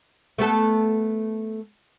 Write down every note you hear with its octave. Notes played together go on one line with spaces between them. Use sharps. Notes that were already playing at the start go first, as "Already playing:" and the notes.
A3 B3 A4